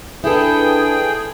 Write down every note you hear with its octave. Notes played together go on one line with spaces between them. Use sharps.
D4 E4 G#4 A4 B4 G5